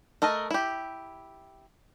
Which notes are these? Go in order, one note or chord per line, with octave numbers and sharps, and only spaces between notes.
A3 A4 A#4 D#5
E4 G4